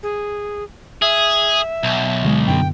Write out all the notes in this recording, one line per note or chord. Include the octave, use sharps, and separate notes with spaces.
G#4
G#4 E5
B1
D2 D3 G#3
F#2 D3 B3 G5